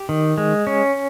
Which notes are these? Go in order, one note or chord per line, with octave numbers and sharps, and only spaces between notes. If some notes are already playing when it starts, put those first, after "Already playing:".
Already playing: G4
D#3
G#3
C#4